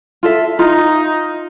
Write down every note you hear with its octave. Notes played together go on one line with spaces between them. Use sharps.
F4 A4 E5
D#4 F4